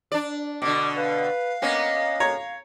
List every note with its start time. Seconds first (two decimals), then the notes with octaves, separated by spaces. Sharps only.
0.12 D4 D5
0.62 B2 D3 D6
0.97 B4 F5
1.62 A#3 B3 C#4 D#5
2.20 C#5 A#5